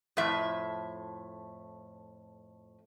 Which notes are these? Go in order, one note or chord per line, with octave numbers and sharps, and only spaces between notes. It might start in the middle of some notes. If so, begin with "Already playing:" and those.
F2 A2 E5